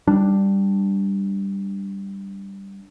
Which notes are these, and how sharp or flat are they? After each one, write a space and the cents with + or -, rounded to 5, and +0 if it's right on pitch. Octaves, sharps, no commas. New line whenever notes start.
G3 +5 D4 +0